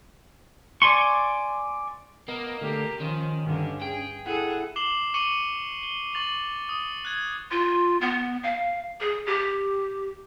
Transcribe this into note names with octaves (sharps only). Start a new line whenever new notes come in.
D5 G#5 C6 C#6
A#3 B3 D#5
D3 A3 G4
D#3 F3 C#4
G2 D3
G#4 G5
E4 G#4 A4 F#5
D6 C7 E7 F#7 G7
C#6 D6 C#7 D#7 F#7 G7
G7
C#6 A6 F7 F#7
D#6
F#6 G#6
F4
B3
F5
G#4
G4